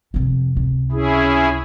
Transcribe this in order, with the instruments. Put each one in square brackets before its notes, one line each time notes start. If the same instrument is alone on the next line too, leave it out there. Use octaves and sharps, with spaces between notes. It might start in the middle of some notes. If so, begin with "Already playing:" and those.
[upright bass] F2 C3
C#2 C3
[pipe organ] C#4 E4 G#4